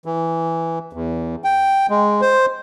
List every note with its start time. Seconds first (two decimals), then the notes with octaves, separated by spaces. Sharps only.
0.06 E3
0.93 E2
1.44 G5
1.90 G#3
2.21 C5